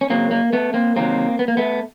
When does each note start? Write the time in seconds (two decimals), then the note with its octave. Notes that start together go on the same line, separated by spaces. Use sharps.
0.01 C#4
0.10 C#3 F#3 A#3 C4
0.31 A#3
0.53 A3 B3
0.74 A#3 C4
0.96 C3 D#3 F#3 A#3 C4
1.39 B3
1.48 A#3
1.57 A3 B3